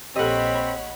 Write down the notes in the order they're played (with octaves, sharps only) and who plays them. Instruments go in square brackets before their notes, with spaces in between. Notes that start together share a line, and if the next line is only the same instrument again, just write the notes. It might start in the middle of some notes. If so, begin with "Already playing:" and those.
[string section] A#1 C#5 B5 [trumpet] C4 [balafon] G4 A4 [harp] D#5 F#5